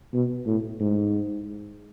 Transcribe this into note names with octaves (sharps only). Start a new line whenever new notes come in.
B2
A2
G#2